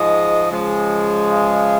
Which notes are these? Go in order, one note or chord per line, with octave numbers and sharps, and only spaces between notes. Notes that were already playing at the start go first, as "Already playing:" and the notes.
Already playing: G#2 F3 G#3 D#5
C#3 F3 G#3
F5